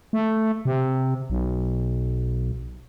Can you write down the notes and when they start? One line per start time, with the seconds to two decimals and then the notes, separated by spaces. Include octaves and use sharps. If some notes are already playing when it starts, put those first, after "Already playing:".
0.13 A3
0.65 C3
1.30 B1